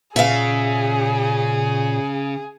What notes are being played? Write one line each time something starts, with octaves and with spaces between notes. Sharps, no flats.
A#2 C#3 G#4 E5 F5